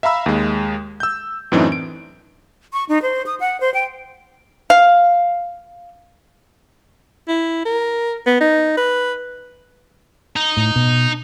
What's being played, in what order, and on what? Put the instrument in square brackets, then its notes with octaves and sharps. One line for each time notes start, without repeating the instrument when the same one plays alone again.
[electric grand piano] E5 F5 A#5 B5 E6
D#2 G#3
E6 G6
F#2 A2 E3 C4 D4 D#4
D7
[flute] C#6
D#4
C5
D#6
F#5
C5
G5
[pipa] F5
[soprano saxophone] E4
A#4
B3
D#4
B4
[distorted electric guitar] D#4
[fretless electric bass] A2
B2